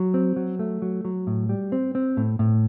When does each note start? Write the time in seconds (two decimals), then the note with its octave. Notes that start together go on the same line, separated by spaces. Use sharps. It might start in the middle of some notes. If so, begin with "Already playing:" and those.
Already playing: F#3
0.14 C4
0.36 F#3
0.59 A3
0.82 F#3
1.05 F#3
1.27 A2
1.49 G3
1.72 C4
1.95 C4
2.17 A2
2.39 A2